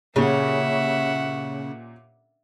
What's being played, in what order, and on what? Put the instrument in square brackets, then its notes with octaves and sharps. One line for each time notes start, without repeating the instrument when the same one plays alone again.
[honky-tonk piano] A#2 C#4 G4 [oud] C#3 [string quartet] E5 F#5